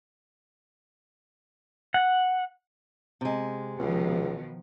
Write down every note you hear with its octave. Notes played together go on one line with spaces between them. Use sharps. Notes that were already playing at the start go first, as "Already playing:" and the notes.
F#5
C3 G#3
C#2 B2 D#3 F3